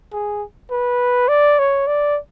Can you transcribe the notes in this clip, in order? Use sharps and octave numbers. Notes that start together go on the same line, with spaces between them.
G#4
B4
D5
C#5
D5